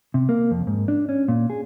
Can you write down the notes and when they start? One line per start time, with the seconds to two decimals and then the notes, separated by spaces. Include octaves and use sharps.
0.14 C3
0.29 A#3
0.51 F2
0.67 G#2
0.88 D4
1.09 C#4
1.28 A#2
1.50 G#4